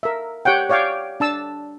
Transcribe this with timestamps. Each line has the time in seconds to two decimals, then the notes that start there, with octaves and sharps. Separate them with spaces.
0.03 A#4 E5
0.45 G4 C#5 F#5 G5
0.70 C#5 D5 F5 G5 D6
1.20 D4 A5 E6